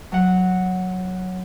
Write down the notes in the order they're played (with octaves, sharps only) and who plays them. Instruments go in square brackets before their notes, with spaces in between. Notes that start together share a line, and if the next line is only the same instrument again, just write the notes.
[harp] F#3 F#5